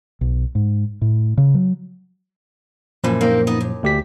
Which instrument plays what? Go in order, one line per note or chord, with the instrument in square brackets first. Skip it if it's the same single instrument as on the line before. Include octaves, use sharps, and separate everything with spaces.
[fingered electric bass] B1
G#2
A2
C#3
F#3
[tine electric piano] F#2 A#2 F3 [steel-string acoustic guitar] E3 A#3
[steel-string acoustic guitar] A#3 C4 D#4
B3 D#4
D#2
[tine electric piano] D2 G4 B6